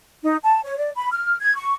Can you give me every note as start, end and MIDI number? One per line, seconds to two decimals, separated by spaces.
0.23 0.37 63
0.43 0.60 81
0.64 0.78 73
0.78 0.90 74
0.95 1.10 83
1.11 1.36 89
1.40 1.55 92
1.56 1.75 85